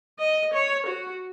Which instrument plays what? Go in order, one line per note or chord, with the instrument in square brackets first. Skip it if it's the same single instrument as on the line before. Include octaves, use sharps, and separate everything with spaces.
[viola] D#5
C#5
F#4